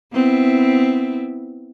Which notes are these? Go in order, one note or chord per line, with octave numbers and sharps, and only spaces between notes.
B3 C4 E4